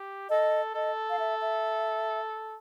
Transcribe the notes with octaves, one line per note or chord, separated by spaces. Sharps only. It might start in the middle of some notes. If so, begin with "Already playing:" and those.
Already playing: G4
A4 D#5
A4 D#5
F5
E5
E5